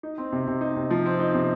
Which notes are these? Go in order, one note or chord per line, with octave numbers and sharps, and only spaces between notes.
D#4
C4
C3
C3
D#4
C3
F3
C4
D#4
C3